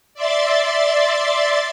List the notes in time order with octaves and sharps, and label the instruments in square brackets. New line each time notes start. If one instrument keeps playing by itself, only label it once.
[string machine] D5 E5 C6 A6